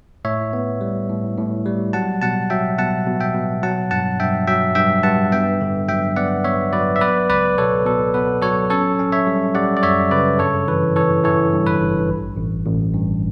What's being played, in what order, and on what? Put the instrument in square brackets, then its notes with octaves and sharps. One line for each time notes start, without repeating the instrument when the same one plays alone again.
[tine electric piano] A2 C#5 E5
B3
G3
A2
A2
G3
F#3 F#5 A5
B2 F#5 A5
F#3 E5 G5
B2 F#5 A5
B2
E5 G5
B2
F#3 F#5 A5
G2 F#5 A5
G2 E5 G5
F#3 E5 G5
G2 E5 G5
G2 F#5 A5
B3 E5 G5
D3
F#3 E5 G5
B3 D5 F#5
B3 C#5 E5
F#3 B4 D5
E5
B3 B4 D5
C#2 B4 D5
B2 A4 C#5
B2 A4
B3 B4
F#3 A4 C#5
C#4 A4 C#5
C#4
C#5 E5
G3
G3 D5 F#5
D5
F#2 C#5 E5
C#3 B4 D5
G2 A4 C#5
E3 B4
E3 A4 C#5
E3 A4 C#5
G2
B4
G1
A1
A1
A1
G2